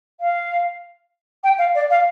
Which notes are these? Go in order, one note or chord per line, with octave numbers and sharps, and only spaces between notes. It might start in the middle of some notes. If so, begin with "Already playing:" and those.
F5
G5
F5
D5
F5